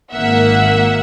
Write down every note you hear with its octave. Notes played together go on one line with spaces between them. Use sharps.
G#1 A#3 E5 F#5